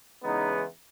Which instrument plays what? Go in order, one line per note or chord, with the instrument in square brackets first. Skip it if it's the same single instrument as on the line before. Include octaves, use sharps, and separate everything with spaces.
[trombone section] E2 C#3 E3 G#3 B3 D#4